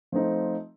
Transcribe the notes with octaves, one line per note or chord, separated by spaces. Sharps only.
F3 A3 C4 D#4